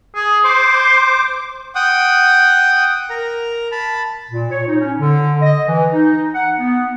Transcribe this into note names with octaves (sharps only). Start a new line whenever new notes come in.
G#4
C5 C6 D6
F#5 G5 D#6
A#4 A#5
A5 B5
A#2
C#5
D#4
C#4
D3
D#5
E3
D#4
F#5
B3